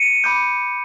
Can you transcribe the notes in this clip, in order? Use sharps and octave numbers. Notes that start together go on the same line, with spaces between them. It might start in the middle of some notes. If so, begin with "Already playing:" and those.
Already playing: C#7 D#7
B5 D6 G6